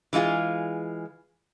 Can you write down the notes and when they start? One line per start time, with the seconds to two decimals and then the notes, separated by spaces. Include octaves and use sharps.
0.13 E3 G#3 A3 F4 G#4